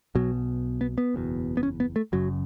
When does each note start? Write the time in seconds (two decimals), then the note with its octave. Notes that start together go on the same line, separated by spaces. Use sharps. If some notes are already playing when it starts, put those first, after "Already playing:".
0.15 B1 B2 F#3
0.81 B3
0.98 B3
1.14 F#1 E2 B2
1.57 B3
1.63 C#4
1.80 B3
1.96 A3
2.12 F#1 F#2 C#3 F#3